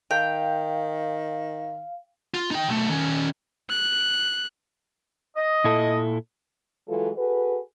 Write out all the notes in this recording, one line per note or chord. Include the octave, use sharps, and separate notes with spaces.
D#3 F5 G5
F4
D#4 G5
B1 A3
D#3 C#4
F#6
D#5
A#2 E4 A4
E3 F#3 G#3 F4 A4
F#4 G#4 A4 B4